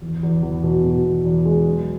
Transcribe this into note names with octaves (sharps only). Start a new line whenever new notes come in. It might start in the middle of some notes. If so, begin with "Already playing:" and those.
E2
E2
E2
B2
B2
E2
E2
G#3
F#3